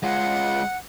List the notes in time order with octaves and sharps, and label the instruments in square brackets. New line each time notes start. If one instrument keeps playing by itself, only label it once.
[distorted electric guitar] G#3 F4 [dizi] F#5